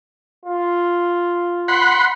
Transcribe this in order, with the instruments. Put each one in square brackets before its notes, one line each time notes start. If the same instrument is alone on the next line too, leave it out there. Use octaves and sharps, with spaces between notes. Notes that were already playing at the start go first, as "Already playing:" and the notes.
[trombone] F4
[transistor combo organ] F#5 B5 C6